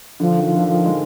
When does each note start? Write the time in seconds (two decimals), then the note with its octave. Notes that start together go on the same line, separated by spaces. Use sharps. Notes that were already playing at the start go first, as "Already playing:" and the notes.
0.20 D3 F3
0.38 D#3
0.44 F3
0.56 D3
0.68 F3
0.74 D#3
0.86 G#3